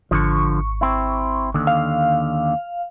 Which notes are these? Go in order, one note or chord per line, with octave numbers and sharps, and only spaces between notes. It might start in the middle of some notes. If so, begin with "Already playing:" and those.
G#1 D3 F3 C#6
C4 E4
D#2 D3
F5